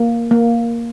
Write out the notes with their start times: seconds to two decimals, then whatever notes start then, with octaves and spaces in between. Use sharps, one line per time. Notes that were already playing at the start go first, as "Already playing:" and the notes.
Already playing: A#3
0.31 A#3